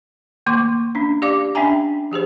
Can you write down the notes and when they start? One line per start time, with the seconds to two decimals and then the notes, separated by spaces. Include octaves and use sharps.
0.46 D#3 A3 A#3 C6 D6
0.95 C#4 D4
1.22 G4 D5 F5 D6
1.55 C#4 D4 E5 G5 G#5 A#5
2.11 F3 G4 G#4 C5